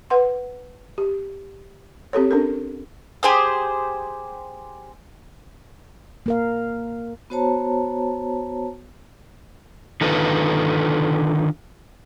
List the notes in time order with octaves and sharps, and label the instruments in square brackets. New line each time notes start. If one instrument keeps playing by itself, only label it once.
[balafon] B4 F#5 C6
G4
C4 G4 A4 C#5
C#4 D4 A4 A#4
[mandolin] G4 G#4 C5 D#6
[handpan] A#3 A#4 F5
[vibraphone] B3 F#4 C5 C#5 A5 A#5
[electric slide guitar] D3 D#3 D#4 F4 A4 B4